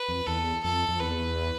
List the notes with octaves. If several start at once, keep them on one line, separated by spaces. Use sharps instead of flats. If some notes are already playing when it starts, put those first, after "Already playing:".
Already playing: B4
F2
E2 A4
F2 A4
F2
E2 B4